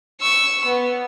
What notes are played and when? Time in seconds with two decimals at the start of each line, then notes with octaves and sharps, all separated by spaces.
0.21 C#6 E6
0.65 B3